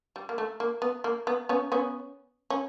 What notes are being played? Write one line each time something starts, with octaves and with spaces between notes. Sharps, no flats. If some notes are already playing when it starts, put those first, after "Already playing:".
G3
A#3
A3
A#3
B3
A#3
B3
B3 C#4
B3 C#4
C#4